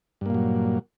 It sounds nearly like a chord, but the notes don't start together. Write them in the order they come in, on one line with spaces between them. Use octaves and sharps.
G2 A#3 A#2 F#3